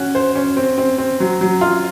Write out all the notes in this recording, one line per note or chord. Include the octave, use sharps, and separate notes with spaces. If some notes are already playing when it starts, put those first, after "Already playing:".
Already playing: C#4 F#4
C5
C#4
C4
C4
C4
F#3
F#3
F4